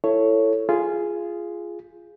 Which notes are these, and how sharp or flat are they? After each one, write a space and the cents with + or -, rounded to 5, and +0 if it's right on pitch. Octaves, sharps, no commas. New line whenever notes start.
E4 +20 A4 +10 C#5 +0
F4 -15 G#4 +0